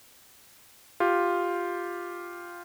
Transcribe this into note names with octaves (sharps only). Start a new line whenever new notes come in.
F4 G4